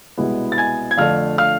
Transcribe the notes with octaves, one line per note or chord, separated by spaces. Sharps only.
C2 B2 G#3 B3 E4
A6
G#5 G#6
G#6
F2 D3 A3 D4 F5 F6
F5 F6